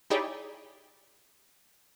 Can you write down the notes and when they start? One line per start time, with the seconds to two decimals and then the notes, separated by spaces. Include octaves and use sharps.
0.10 D#4 E4 G4 G#4 C#5 D5